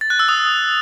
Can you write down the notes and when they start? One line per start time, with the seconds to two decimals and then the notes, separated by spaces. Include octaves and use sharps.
0.01 A6
0.10 F#6
0.19 E6
0.29 D#6